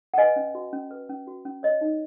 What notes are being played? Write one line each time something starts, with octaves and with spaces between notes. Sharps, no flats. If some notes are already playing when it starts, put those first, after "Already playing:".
F#5
B4 D#5 G#5
C#4
F#4
C#4
B4
C#4
F#4
C#4
C#5 D#5
D#4